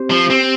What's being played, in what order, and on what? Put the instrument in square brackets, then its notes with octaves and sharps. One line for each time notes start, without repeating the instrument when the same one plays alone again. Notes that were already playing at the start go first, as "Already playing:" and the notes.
Already playing: [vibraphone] C4 G4 C5
[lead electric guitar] F3
C4